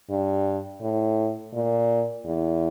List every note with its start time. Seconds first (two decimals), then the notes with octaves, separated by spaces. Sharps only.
0.10 G2
0.81 A2
1.54 A#2
2.25 E2